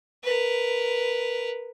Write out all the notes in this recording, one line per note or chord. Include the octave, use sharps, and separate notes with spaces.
A#4 B4